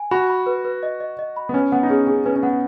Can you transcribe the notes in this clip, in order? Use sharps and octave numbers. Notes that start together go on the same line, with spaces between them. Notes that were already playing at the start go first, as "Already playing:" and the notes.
Already playing: G#5
F#4 B5
B5
B4
B4
D#5
D#5
D#5
B5
B3
C#4 B4
B3 F#5
D#4
C#4 G#4
C#4 G#4
C#4 B4
C#4
B3 F#5